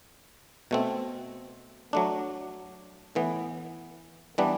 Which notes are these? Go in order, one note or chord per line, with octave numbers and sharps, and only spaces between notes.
B2 A3 C4
F#3 A3 D4
A2 E3 B3
E3 G3 B3 D4